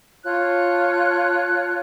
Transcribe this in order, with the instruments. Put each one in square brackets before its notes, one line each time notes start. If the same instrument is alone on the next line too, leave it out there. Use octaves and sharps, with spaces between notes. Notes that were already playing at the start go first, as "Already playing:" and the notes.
[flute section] F4 C#5 A5 F#6